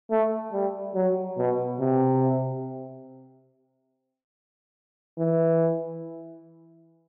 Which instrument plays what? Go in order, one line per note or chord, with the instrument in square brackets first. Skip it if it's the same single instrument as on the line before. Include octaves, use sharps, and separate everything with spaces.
[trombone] A3
G3
F#3
B2
C3
E3